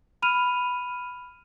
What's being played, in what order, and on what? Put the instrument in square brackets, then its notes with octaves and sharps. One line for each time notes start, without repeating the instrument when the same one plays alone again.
[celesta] B5 F6 D#7 F7